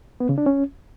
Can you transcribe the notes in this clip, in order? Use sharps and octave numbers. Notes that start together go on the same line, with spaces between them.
B3
C#3
D4
C#4